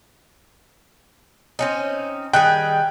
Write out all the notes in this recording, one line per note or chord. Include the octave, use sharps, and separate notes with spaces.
C4 C#4 D#4
D#3 G3 G#4 G5 F#6